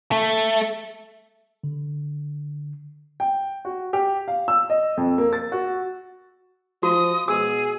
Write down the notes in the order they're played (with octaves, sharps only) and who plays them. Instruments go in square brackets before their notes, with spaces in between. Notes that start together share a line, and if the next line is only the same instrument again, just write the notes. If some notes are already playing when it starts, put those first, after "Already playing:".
[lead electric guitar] A3
[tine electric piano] D3
[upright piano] G5
F#4
G4
F5
E6
D#5
F2
A#3
A6
F#4
[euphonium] F3 [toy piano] F#4 [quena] D#6
[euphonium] B2 [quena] G#4 [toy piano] E6